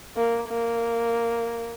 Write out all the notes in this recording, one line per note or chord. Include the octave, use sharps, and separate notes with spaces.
A#3
A#3